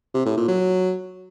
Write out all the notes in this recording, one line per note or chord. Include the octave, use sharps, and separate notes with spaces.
C3
A2
A#2
F#3